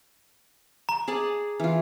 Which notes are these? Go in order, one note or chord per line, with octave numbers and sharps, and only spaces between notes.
A#5
G#4 D5 A5
E3 F4